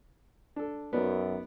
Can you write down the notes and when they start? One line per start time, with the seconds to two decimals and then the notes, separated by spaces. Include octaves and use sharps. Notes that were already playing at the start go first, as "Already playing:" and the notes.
0.56 D4 A4
0.93 F#2 B3 D#4 D5